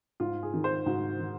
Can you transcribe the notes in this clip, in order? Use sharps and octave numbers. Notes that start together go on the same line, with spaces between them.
G#2 F4
G#4
D#3
C5
G#2 F#4
D#3